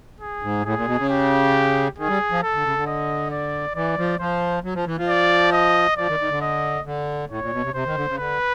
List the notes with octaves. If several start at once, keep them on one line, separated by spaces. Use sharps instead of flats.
G#4
G#2
A2 G#4
A#2
B2
C#3
G4
D#3 G#4
G3
F3
A4
D3
C#3
D3
D#5
D5
E3 D5
F3
F3 C5
F#3
F3
E3
F3
D5
D#5
F3 D5
D#3
D#3
D3
D#5
D3
A2 C#5
A#2
B2
C3
C3 C5
D#3
D3
C#3
D3 B4